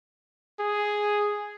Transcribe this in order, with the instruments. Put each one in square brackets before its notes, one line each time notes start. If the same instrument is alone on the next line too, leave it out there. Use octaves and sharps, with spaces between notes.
[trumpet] G#4